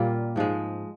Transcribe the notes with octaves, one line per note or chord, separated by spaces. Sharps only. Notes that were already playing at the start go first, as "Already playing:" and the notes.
Already playing: A#2 G3 A#3 C#4 F4
G#2 F3 G#3